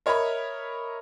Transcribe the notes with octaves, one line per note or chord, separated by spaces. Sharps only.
A#4 C#5 D#5 E5 B5 C#6